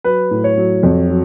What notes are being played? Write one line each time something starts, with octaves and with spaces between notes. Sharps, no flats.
F#3 B4
A2
C#5
F#3
F2
F#3